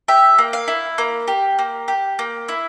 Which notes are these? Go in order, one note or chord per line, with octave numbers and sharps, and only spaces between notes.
G4 E5
A#3
F5
E4
A#3
G4
A#3
G4
A#3
E4